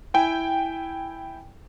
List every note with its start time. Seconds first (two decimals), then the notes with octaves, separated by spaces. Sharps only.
0.14 E4 G5 G#5